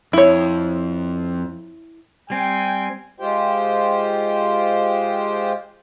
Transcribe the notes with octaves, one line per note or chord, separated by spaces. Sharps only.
F2 E4 C#5
G3 C4 G5 G#5
G#3 F4 G4 C5 G5